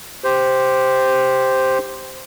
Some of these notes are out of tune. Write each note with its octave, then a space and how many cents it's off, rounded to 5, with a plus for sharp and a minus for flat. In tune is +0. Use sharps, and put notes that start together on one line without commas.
G4 +0 C5 +0